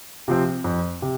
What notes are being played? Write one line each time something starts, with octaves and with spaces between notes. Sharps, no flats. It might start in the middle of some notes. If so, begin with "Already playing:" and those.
C3 F3 C4
F2
C3